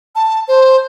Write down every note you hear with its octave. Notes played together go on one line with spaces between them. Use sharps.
A5
C5